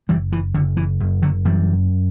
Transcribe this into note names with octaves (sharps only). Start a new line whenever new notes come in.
F#1 E3 G3
E3
F#1 D3
E3
F#1
D3 F#3
F#2 E3 G3